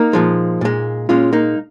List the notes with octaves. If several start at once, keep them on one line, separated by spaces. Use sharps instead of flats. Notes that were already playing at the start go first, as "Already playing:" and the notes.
Already playing: A#3 D#4
A#2 F3 G#3
A#2 G#3
A#2 G#3 C#4 F4
A#3 D#4